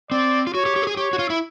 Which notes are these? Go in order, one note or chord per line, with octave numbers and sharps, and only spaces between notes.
C4 D5
F4
F#4 C#5
G4
G4
A4
G#4
G4 C#5
F#4
F4
E4